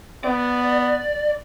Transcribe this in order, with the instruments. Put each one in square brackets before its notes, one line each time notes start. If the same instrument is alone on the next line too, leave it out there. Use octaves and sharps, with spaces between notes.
[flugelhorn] B3 [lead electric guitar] D5